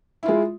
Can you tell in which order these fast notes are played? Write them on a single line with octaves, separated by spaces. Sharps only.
E4 F4 G#3